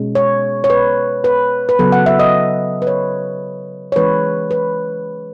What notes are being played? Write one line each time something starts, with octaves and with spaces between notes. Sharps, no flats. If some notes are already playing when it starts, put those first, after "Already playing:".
Already playing: B2 G#3 C#4
C#5
C#5
B4
B4
B4
C#3 F#3 B3 A4
F#5
E5
D#5
B4
C#5
C#5
E3 G#3 C#4 B4
B4